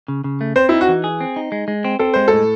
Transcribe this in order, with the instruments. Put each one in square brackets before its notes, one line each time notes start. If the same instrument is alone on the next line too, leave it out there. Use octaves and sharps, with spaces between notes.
[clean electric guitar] C#3
C#3
A3
[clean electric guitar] C4 [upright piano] C5
[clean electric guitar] D#4 [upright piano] E4
[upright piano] F#4
[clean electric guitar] E3
G#4
C4
D#4
G#3
G#3
C4
[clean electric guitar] C4 [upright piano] A4
[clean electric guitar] G#3 [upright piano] C5
[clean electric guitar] A2 [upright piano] A4